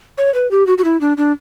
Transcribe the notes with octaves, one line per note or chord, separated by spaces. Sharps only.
C#5
B4
G4
F#4
F#4
E4
D4
D4